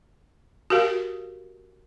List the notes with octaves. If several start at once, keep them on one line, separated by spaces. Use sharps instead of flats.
F#4 G4 A#4 F5